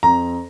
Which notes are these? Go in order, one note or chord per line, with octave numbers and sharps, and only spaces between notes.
F2 A#5